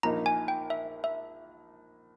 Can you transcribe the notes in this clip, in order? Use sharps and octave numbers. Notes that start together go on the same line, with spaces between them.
A#1 A#2 A#3 D#4 A#5
G#5
G5
E5
E5